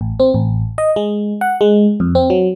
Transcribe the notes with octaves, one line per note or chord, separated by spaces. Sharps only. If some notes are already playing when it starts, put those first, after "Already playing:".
A1
C4
A1
D#5
G#3
F#5
G#3
F2
C4
F#3